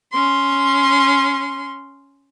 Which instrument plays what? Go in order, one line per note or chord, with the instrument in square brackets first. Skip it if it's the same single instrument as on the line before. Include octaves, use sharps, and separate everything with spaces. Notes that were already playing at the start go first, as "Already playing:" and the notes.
[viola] C#4 C6